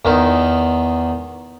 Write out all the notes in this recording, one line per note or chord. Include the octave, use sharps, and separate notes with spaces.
E2 D#3